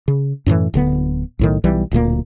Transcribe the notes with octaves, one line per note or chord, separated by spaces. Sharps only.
C#3
F#2 A2 C#3 E3
D1 D3 B3
B1 A2 D#3
B1 E3 G3
D1 D2 A#2 A#3